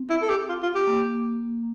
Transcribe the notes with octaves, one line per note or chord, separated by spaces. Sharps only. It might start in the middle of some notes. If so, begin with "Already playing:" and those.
Already playing: C4
E4
A4
G4
F4
F4
G4
A#3